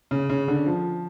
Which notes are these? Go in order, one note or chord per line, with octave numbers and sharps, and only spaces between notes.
C#3
C#3
D3
F3